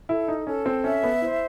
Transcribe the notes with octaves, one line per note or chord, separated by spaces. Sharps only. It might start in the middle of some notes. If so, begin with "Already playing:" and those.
E4 A4
D#4
C#4 A4
C4
C#4 E5
B3
E4 C5